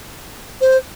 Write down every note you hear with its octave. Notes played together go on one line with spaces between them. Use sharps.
C5